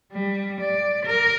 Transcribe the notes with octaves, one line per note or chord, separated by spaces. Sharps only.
G3
D5
A#4